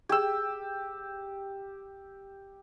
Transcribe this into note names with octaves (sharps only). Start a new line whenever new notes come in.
G4 G#4 G5 E6